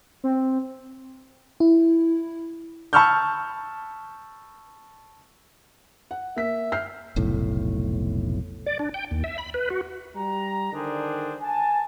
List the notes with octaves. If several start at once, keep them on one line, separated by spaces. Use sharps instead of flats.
C4
E4
A5 B5 C#6 E6 F6 G6
F#5
A#3 E5 B6
F6 G6 C7
F1 B1 A2
D5
D4
G5
D#2
E5
B5
B4
F#4
G3 A#5
D3 D#3 D4 G#4 C5
G#5 A5